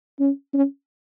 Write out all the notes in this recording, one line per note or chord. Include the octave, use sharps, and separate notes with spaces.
C#4
C#4